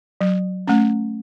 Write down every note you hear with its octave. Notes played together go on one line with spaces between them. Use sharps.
F#3
A3 C#4